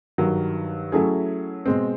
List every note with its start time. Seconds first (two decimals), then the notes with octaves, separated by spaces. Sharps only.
0.18 G2 D#3 F#3
0.92 F#3 A3 C#4 E4 G#4
1.66 B2 G#3 C4